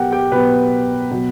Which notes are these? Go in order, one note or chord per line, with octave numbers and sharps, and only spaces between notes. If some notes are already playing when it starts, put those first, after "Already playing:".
Already playing: B2 F#3 B3 G4 A#4 F#5 G5
G4 G5
B2 F#3 B3 B4 B5
B2 F#3 B3